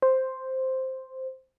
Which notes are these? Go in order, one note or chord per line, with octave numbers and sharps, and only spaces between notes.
C5